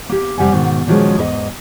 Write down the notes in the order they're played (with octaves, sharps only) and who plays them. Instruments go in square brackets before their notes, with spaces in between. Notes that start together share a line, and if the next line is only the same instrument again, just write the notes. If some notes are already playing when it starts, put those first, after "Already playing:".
[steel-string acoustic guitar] A#3 G4
F2 C3 G3 F#5 G#5
G#2 B2 D#3
A#2 D#3 F3 F#3 G#3 C#4
E2 G#2 A#4 D#5